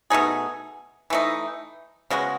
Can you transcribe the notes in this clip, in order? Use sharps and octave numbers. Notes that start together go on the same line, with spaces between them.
B2 A3 D#4 G#4
E3 A3 D#4
C#3 G#3 B3 F#4